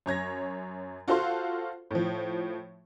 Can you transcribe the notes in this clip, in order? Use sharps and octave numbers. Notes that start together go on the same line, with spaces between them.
F#2 C#5 G#6 A#6
F4 F#4 A4 C5 F5 C6
A2 F3